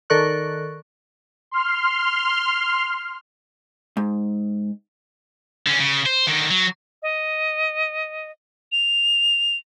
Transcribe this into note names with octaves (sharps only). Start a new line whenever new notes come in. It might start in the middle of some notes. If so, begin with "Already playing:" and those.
D#3 A4 A#4 D5 C#6 F#6
C6 F6
G#2
D3 C#4
C#3
C5
D3 D#3
F#3
D#5
F7